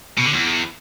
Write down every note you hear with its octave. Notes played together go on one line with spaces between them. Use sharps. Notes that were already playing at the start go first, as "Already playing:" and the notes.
B2
D3
E2